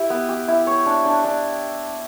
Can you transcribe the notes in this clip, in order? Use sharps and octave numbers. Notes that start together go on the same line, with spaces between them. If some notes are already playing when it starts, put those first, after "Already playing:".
Already playing: E4 G4
B3
G4
E4
C#5
D4
D4
D4